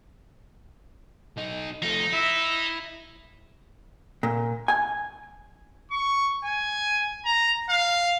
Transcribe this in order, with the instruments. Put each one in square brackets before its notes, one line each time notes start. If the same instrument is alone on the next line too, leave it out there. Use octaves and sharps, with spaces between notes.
[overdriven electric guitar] B1 D#4
[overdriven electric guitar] F3 A3 [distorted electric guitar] D#4
[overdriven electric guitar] E4 [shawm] E5
[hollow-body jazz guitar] A#2
G#5
[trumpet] C#6
G#5
A#5
F5